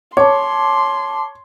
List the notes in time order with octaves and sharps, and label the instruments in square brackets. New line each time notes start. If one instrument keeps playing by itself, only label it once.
[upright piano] C#5 [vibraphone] A5 D6 [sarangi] C6